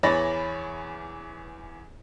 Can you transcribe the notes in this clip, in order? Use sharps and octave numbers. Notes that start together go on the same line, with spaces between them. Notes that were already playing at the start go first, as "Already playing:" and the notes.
E2 E3 C#5 B5 A6 A#6